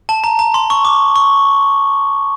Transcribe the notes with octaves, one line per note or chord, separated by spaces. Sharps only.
A5
A#5
A#5
C6
C#6
D6
C#6